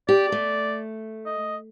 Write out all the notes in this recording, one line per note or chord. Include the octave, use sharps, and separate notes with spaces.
G4 D5
A3
D#5